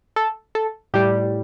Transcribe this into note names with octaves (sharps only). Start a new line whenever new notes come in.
A4
A4
A2 G3 G4